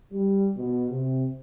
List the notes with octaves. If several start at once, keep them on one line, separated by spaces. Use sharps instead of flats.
G3
B2
C3